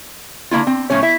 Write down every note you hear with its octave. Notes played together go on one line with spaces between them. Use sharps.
D3 A#3 E4 F4
C4
A2 F3 C#4 C#5
E4 E5